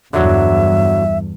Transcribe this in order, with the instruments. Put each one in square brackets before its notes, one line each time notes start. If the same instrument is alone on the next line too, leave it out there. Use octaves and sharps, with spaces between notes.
[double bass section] E2 G2 [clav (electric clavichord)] D3 F#3 [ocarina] E5